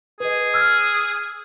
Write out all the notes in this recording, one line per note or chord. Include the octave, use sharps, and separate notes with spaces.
G#4 B4 D#5
E6 F6 G#6